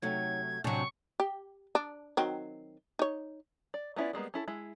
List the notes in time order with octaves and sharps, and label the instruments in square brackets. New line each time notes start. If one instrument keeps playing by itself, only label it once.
[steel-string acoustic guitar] C3 F#3 A3 [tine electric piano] D#4 C#5 F#5 [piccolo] G#6
[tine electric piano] A2 G#5 G6 [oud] C3 F#3 [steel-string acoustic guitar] D4 A#5 [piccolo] C#6
[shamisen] G4
D4
D#3 F#3 C4
D#4 C#5
[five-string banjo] D5
B3 C#4 E4 F4 D5
G3 G#3 A#3 B3
C#4 E4 A4
G#3 E4